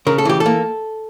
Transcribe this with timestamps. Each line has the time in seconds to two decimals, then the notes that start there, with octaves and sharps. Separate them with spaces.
0.07 C#3 A#4
0.18 A4
0.25 E3 G4
0.40 A4
0.46 A#3